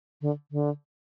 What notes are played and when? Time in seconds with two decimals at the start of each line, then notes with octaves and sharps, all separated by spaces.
0.22 D3
0.52 D3